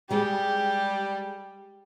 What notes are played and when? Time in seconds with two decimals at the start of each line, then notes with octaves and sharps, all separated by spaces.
0.10 G3 G#3 G4 G#4